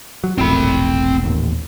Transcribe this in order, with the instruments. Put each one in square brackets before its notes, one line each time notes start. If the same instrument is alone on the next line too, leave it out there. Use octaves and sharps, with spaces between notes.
[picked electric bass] F#3
[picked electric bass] E1 A#1 A2 [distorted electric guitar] C4 B5
[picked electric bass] D#1 A1 D#2